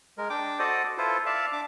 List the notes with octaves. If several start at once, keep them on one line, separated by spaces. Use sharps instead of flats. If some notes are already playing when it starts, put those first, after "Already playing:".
G#3 A#4
D4 G5 D6
F#4 A4 C5 D5 D#5 D#6
E4 F4 A4 B4 C5
D5 E5 F5 A5
D4 D6